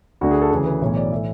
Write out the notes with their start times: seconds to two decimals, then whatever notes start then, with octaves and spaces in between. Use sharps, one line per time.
0.21 D2 D3 F#4
0.31 G#4
0.42 A4
0.51 D2 C#3 E3 G#4
0.66 B4
0.82 B1 A2 E3 C#5
0.96 D5
1.12 A2 E3 E5